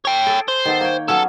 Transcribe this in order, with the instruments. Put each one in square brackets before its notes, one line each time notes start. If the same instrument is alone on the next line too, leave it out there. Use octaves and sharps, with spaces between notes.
[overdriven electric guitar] C#5 G5
[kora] G#4 A4
[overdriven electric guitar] C5
[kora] D#3 B3 A4
A#3 C#5 G5
[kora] F#3 B3 C#4 [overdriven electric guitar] A4